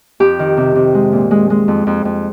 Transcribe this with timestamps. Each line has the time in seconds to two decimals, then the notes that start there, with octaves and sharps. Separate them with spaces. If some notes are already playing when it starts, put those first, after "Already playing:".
0.20 F2 G4
0.39 D#3
0.57 C3
0.76 C3
0.95 G#3
1.12 A#2
1.31 G#3
1.50 G#3
1.68 F2
1.87 F2
2.05 F2